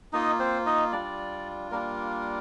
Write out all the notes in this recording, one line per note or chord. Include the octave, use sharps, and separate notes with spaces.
A#3 D#4 F4 D#5
C4 C5
D#4 D#5
G3 D4 F4 D5
G3 A#3 D4 F4 A#4